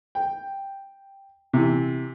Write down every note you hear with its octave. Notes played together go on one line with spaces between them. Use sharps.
G5
C3 E3